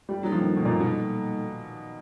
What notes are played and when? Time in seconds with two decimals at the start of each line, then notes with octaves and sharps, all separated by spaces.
0.09 G3
0.22 F#3 G3 A#3 D#4 F#4 A4
0.32 F3
0.41 D#3
0.56 B2
0.65 A#2
0.80 B2